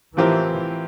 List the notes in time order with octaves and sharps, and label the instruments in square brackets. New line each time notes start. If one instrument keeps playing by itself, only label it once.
[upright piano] A2 F3 C4 G4 A#4 [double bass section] E3